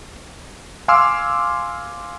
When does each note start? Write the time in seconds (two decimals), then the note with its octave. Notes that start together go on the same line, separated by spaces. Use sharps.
0.88 F5 G#5 C6 D6 E6 F6